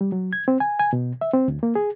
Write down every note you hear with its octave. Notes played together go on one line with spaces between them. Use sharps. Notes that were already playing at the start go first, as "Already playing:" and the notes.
G3
F#3
G#6
C4
G#5
G#5
B2
E5
C4
D2
A#3
G#4